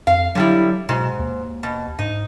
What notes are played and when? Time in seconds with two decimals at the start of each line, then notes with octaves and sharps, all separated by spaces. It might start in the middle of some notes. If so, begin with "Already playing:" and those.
0.07 F2 F5
0.35 D3 F#3 G3 E4
0.89 G#2 B2
1.19 D#2
1.63 B2
1.99 G#2 D#4